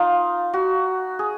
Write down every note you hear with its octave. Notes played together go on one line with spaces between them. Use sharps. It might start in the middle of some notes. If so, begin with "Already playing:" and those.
Already playing: D#4 F4
F#4
G#4